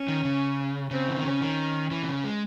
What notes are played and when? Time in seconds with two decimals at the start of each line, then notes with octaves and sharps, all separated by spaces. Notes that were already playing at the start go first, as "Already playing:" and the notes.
Already playing: C#4
0.08 D#3
0.25 C#3
0.91 C#3 C4
1.08 E3
1.17 D#3
1.24 C#3 C#4
1.41 D#3
1.91 E3
2.03 C3
2.08 C#3
2.24 G#3